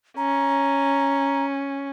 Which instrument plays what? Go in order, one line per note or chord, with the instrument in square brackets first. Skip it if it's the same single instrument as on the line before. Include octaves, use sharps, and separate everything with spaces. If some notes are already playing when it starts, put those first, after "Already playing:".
[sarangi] C#4 [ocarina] A#5